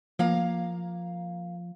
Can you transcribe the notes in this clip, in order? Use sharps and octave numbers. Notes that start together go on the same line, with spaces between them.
F3 A#3 F5 A#5